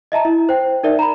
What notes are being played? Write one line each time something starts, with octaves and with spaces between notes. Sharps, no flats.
D#5 E5 A5 A#5
E4
C5 G5
D#4 A#4 D5 E5
A#5 B5